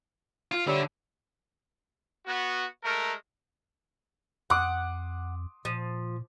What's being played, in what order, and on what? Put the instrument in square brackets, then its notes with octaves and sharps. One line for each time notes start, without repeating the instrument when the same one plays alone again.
[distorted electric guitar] F4
[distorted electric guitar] D3 [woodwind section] G3 C#5 E5
[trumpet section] B3 F#4
G#3 A3 A#4
[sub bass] F2 [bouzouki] F#5 [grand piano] C6 D6 D#6
[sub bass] A#2 [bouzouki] F3